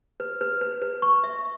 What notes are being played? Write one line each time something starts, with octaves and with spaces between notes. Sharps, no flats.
B4
B4
B4
B4
C#6
E5